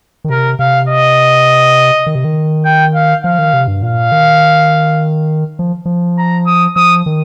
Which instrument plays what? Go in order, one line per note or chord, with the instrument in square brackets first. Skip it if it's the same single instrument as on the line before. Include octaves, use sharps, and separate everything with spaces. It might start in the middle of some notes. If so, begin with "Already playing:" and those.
[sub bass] D#3
[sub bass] C3 [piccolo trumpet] A#4
[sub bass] C3 [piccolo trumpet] F5
[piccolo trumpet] D#5
[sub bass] D#3
C3
D#3
[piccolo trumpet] G5
F5
[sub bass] F3 [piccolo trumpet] F5
[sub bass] D#3
C3
G2
[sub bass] A#2 [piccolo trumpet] F5
[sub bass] D#3
F3
F3
[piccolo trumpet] A#5
D#6
[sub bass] F3 [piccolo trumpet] D#6
[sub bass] D#3